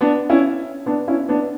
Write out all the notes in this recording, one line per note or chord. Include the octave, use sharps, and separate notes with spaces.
B3 D4
C#4 E4
B3 D4
C#4 E4
B3 D4